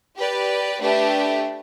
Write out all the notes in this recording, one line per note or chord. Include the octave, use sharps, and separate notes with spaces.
G4 B4 D5
A3 D4 G4 B4 E5